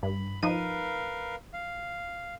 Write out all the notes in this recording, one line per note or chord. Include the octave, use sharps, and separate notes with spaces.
G2 B5
F3 D#4 A#4 B4 F5 D#7
F5